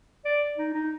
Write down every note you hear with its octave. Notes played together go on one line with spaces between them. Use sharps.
D5
D#4
D#4